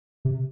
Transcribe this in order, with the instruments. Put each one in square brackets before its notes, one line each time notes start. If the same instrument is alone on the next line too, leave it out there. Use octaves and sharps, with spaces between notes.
[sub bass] C3